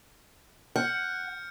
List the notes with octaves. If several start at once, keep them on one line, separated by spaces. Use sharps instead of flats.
F#5 F6 G6 C#7